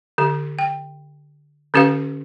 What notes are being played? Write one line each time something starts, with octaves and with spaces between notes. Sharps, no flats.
D3 G4
G5
D3 C#4 G4 B4 F5